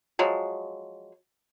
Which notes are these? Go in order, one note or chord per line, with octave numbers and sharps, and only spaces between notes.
F3 F#3 G#3